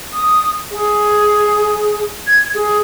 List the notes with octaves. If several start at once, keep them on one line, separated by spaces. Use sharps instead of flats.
D#6
G#4
G#6
G#4